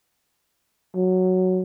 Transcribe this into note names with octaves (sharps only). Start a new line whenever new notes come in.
F#3